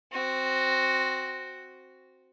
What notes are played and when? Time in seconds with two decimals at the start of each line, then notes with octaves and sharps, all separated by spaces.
0.11 C4 F#4